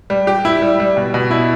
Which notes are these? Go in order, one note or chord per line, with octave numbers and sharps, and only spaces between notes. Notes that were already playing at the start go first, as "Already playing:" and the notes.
G3
G4
E4
G3
G3
B2
B2
E4